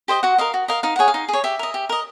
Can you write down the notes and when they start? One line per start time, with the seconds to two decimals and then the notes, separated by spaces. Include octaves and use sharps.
0.08 G4 C5 D#5
0.23 F#4 F#5
0.38 A#4 D#5 F5
0.54 F#4
0.68 A#4 D#5 F5
0.83 D#4 F5
0.96 G#4 C#5 F#5
1.08 F5
1.14 D#4
1.28 G#4
1.33 C#5
1.44 G4 E5
1.59 A#4 D#5
1.74 G4
1.89 A#4 D#5